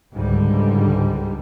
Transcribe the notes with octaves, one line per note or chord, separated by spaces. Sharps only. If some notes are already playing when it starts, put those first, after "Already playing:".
C#2 G#2 D3 G3